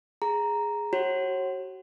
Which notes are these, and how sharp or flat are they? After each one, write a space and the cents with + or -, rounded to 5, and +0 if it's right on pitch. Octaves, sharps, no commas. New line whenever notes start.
G#4 +0 A#5 +0
F#4 +30 C#5 -35